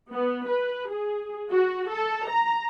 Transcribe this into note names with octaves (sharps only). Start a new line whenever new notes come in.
B3
B4
G#4
F#4
A4
A#5